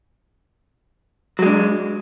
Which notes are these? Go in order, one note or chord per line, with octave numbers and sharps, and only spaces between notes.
F#3 G#3 D4